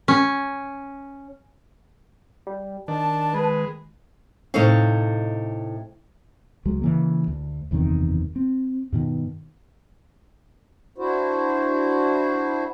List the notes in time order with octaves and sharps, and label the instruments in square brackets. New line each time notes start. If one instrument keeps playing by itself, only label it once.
[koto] C#4
[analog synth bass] G3
[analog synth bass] D#3 [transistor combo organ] D4 [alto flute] A5
[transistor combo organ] G#3 [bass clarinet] B4
[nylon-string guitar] A2 C3 D#4 A4 C#5 F5
[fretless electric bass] C#2 F#3 G#3
C#3 E3 A#3
D2
F#1 E2 C3 D#3
C4
G2 B2 D#3
[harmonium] D4 E4 F#4 C5